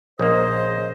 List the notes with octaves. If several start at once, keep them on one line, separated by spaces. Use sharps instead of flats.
A#1 C#3 A#3 C5 D#5